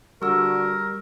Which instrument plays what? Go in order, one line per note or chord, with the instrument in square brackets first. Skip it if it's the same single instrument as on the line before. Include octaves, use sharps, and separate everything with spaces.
[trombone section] D3 F#4 [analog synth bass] G3 [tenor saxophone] A#4 [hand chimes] C#6 E6